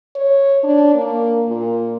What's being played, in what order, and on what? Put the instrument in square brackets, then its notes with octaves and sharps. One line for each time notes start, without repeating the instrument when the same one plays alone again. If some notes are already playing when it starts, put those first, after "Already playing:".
[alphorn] C#5
D4
A#3
A#2